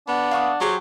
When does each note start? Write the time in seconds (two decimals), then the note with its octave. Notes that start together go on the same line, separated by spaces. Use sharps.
0.08 B3 D4 F#5
0.31 F5 C#6 D#6
0.60 F#3 G4 G#4 C5